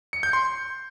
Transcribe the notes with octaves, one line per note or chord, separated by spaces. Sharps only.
C#7
G6
C6